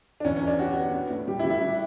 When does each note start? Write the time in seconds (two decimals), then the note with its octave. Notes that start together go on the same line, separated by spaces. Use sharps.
0.20 D4
0.24 E2 C#4
0.36 C#4
0.41 E2
0.47 D4
0.58 F#4 G4
0.75 B3
0.94 B3
1.10 A2
1.28 G3 G4
1.39 E4
1.45 G3
1.50 E4
1.62 D4